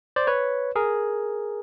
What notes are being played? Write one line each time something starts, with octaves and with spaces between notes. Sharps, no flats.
C5 D5
B4 C#5
G#4 A#4